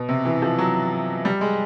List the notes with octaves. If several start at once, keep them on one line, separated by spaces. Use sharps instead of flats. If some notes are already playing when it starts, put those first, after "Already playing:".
Already playing: B2
C3
E3
F3
F#3
G3
G#3